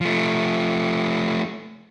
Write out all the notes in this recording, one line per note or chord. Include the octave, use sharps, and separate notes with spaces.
F3 A3